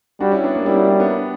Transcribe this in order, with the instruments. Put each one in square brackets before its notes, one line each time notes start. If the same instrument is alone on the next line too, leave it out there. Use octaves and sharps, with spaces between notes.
[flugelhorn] G3 [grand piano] D4 F#4
[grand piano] C#4 E4
B3 D4
A#3 C#4
[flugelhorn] G3 [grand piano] C#4 E4
[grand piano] D4 F#4
C#4 E4
B3 D4